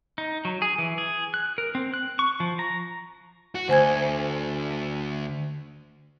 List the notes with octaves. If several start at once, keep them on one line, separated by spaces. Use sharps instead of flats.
D#4
F#3
G#4
E3
G#4
F#6
A#4
C4
F#6
C#6
F3
A#5
F#4
D2 C5 G#5 G#6